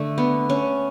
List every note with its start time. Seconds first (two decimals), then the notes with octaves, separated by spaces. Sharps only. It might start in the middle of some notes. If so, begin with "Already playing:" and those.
Already playing: D3 A3
0.18 B3
0.50 C#4